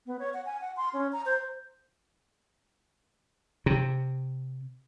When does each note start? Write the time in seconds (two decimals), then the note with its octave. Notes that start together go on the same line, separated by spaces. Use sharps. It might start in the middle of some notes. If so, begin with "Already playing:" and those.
0.06 B3
0.19 C#5
0.34 F#5
0.46 G#5
0.61 F#5
0.77 C6
0.94 C#4
1.13 A#5
1.26 C5
3.66 C3